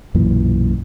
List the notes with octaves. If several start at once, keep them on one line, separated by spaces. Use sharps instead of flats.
B1 F#2 A#2 E3